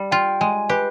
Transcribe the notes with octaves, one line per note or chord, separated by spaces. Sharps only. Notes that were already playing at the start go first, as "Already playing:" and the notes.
Already playing: G3
F4 G5
G#3 G#5
G4 B4